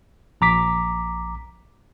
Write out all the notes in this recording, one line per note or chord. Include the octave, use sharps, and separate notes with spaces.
A#1 A#5 D6 B6